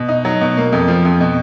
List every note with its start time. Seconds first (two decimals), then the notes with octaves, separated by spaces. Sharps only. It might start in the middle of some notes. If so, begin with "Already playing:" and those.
Already playing: B2
0.09 D#4
0.25 F#3
0.41 B2
0.57 A#3
0.72 F2
0.88 F3
1.05 F2
1.21 B2